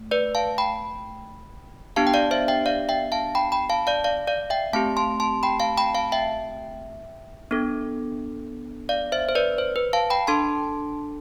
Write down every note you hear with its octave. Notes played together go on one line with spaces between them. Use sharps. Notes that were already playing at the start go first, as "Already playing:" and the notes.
Already playing: A3
B4 D5
F5 A5
G5 B5
B3 D4 G4 F5 A5
G5
D5 F5
C5 E5
E5 G5
D5 F5
E5 G5
F5 A5
G5 B5
G5 B5
F5 A5
D5 F5
D5 F5
D5 F5
E5 G5
A3 C4 G4 F5 A5
A5 C6
A5 C6
G5 B5
F5 A5
G5 B5
F5 A5
E5 G5
B3 D4 A4
D5 F5
C5 E5
C5
B4 D5
C5
B4
F5 A5
G5 B5
D4 A4 A5 C6